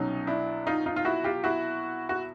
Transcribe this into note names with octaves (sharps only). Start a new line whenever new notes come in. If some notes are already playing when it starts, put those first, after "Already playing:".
Already playing: C2 B2 F#3 C#4 D#4
D4 E4
D#4 F4
D#4 F4
F4
E4 F#4
F4 G4
E4 F#4
F#4